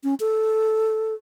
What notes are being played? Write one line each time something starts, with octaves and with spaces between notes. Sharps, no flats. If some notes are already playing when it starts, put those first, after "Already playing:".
C#4
A4